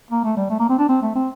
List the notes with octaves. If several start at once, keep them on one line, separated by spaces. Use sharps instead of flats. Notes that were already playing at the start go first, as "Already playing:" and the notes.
A#3
A3
G3
A3
A#3
C4
D4
C4
A3
C4